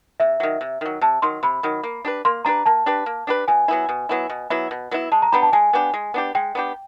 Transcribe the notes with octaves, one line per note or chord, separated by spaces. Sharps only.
C3 E5
D#3 F#3
C3
D#3 F#3
C3 A5
D#3 F#3 C6
C3 B5
D#3 F#3
A#3
D4 G4 B4
A#3 C6
D4 G4 B4 A#5
A#3 A5
D4 G4 B4
A#3
D4 G4 B4
B2 G#5
F#3 B3 E4
B2
F#3 B3 E4
B2
F#3 B3 E4
B2
F#3 B3 E4
G#3 A5
A#5
B3 D4 G4 B5
A5
G#3 G#5
B3 D4 G4
G#3
B3 D4 G4
G#3 G5
B3 D4 G4